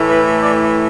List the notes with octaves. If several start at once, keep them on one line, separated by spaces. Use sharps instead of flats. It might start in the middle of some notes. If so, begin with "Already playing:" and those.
Already playing: A2 E3 A3
B4
D5